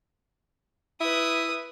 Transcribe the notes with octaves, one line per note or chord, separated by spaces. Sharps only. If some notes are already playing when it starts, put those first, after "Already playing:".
E4 B4 D#6